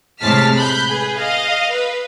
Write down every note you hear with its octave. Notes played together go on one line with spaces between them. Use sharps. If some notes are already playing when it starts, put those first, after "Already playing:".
A2 C3 G#3 A5 F6 B6
B5 F#6 G6
G#4 B4
D#5 F5
B4